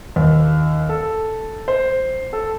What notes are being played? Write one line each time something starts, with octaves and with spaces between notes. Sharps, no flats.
D#2
A4
C5
A4